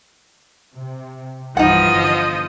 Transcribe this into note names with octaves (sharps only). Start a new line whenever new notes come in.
C3
C2 G2 E3 F3 D#4 D#5 F#5
G1